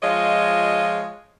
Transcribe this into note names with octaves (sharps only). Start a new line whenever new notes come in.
F3 G#3 F4 C#5 D#5